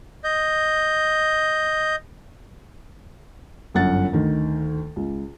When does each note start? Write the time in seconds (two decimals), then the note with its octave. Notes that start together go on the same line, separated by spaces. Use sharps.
0.24 D#5 G6
3.74 G1 F#2 F#5 A6
4.13 D2 D#3
4.96 C#2